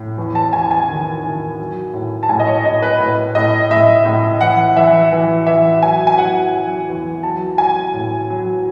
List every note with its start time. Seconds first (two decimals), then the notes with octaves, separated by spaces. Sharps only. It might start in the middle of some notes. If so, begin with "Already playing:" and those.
Already playing: A2
0.18 E2
0.35 A5
0.53 E2 G#5
0.71 G#5
0.89 D#3
1.23 D#3
1.59 F#3
1.94 A2
2.23 A5
2.29 A2 G#5
2.40 D#5
2.47 C#5
2.65 A2 D#5
2.82 B4
3.00 A2
3.35 A2 D#5
3.71 A2 E5
4.05 A2
4.41 E3 F#5
4.76 E3 E5
5.12 E3
5.46 E3 E5
5.82 F#3 G#5
6.07 G#5
6.17 F#3 F#5
6.53 F#3
6.88 E2
7.23 F#3 A5
7.58 F#3 G#5
7.93 A2
8.30 F#3